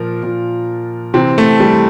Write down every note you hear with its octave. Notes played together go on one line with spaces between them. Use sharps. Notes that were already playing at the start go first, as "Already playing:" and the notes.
Already playing: A#2 F3 A#4
A#2 F3
C3 E3 C4
A3
G3